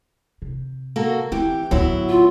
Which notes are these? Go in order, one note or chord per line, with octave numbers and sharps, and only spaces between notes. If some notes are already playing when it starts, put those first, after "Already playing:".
C3
A#3 F#4 A4
E3 C4 G4
A1 D2 F#3 B3 E4
F4